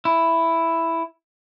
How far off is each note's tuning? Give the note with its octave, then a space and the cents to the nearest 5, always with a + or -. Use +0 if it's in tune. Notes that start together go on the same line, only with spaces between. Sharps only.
E4 +5